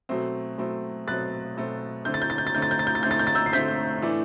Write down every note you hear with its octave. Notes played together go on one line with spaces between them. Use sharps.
B2 F#3 A3 C4
B2 F#3 A3 C4
B2 F#3 A3 C4 F#6 A6
B2 F#3 A3 C4
D3 A3 C4 G6
A6
G6
A6
G6
A6
D3 A3 C4 G6
A6
G6
A6
G6
A6
D3 A3 C4 G6
A6
G6
A6
E6 G6
C7
D3 A3 C4 G6 B6
A2 E3 A3 D4